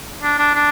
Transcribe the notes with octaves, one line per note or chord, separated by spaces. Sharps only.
D4
D4
D4